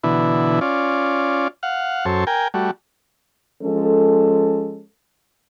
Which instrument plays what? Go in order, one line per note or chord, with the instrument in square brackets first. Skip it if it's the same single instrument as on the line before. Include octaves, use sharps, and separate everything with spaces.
[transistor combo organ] B2 D3 E3 E4
C#4 F4 D5
F5 F#5
F#2 A4 C5 C#5
A#4 G5 G#5
G3 A3 F#4
[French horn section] F3 G#3 C#4 A4